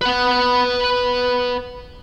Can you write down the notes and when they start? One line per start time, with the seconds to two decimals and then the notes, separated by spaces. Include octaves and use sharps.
0.01 B4 F#5